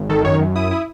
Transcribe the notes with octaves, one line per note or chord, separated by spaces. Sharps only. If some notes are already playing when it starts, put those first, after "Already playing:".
Already playing: G#1
D#3 A4
F#2 C#5
F#2
E4 D#6
E4